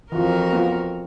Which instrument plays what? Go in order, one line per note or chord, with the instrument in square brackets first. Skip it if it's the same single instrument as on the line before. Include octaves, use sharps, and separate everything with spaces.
[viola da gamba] F2 F#4 A#4 [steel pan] E3 F4
[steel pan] B3 F4